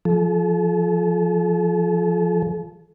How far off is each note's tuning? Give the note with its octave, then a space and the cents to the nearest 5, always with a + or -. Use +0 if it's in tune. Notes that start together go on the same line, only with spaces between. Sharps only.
F3 +0 A4 -40